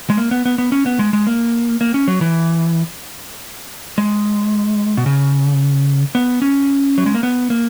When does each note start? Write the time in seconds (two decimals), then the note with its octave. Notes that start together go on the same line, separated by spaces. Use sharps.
0.10 G#3
0.17 A#3
0.31 B3
0.45 B3
0.58 B3
0.72 C#4
0.86 B3
0.99 G#3
1.13 G#3
1.27 A#3
1.81 A#3
1.94 C#4
2.08 F#3
2.21 E3
3.98 G#3
4.97 B2
5.06 C#3
6.15 B3
6.42 C#4
6.98 F#3
7.06 G#3
7.14 A#3
7.23 B3
7.50 A#3